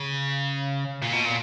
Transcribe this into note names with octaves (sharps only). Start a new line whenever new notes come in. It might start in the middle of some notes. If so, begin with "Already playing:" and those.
Already playing: C#3
A#2
B2
A#2